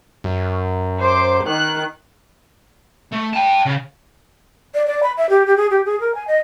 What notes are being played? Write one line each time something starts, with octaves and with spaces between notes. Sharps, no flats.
F#2
C5 D6
D#3 F#6
A3
G5 A5
C#3
D5
D5
B5
E5
G4
G4
G#4
G4
G#4
A#4
G#5
D#5